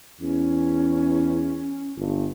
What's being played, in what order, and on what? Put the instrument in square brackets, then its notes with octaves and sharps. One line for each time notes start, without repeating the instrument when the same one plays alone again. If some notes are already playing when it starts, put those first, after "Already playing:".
[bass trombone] E2 [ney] C#4
[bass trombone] G1